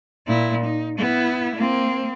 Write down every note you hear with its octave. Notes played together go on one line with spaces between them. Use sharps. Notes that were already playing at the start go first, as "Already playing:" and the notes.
A#2 E4
D#4
B3 E4
A#3 C4